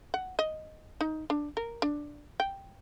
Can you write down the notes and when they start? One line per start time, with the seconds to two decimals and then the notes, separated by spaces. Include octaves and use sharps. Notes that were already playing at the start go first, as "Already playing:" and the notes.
0.14 F#5
0.39 D#5
1.01 D#4
1.30 D4
1.57 A#4
1.82 D4
2.40 G5